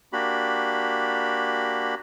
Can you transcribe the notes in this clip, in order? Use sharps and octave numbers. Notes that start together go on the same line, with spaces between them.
A#3 D4 F#4 G4 B5